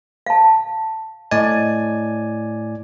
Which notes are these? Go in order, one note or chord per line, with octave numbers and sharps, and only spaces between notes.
F5 A5
A2 D5 D#5 G#5